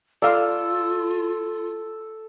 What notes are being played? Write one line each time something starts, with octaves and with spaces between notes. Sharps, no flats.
F4 A4 D5 F5